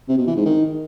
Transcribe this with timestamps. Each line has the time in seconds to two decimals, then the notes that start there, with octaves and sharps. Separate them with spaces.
0.09 C3
0.18 B2
0.27 E3
0.36 G#2
0.45 D#3